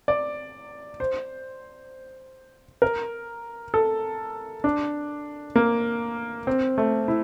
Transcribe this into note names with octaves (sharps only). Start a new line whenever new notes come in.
D5
C5
A#4
A4
D4
A#3
C4
A3
E4